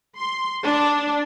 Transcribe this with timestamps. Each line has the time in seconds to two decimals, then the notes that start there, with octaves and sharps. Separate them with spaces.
0.17 C6
0.64 D4